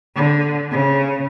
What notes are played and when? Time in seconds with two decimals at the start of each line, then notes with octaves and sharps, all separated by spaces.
0.16 D3
0.72 C#3